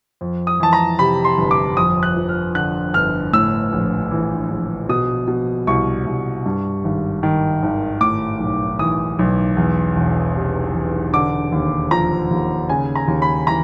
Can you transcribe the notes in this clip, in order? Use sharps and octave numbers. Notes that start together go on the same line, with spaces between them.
F2
D#6
E3 A5
A#5
C3 B5
C6
G1
D6
F2 D#6
F#6
F3
F6
D3 F#6
G1 F6
A2 E6
A#1
E3
A#1
B2 D#6
B2
C2 C#6
C2
G2
G#1
D#3
G#1
A2 D6
B1
E3 D#6
B1
E2
E1
C3
E1
D3 D6
D#2
F3 A#5
D#2
C#3 G#5
A#5
D#2
B5
E3 A#5